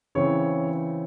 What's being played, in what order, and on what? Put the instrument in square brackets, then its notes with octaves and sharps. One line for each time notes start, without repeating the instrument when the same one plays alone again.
[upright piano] C#3 E3 C4 C#5